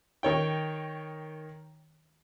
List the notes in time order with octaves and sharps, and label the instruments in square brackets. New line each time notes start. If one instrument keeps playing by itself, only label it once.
[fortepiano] D#3 C#5 G5